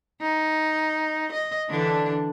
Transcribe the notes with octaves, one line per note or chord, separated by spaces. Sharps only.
D#4
D#5
D3 E3 D4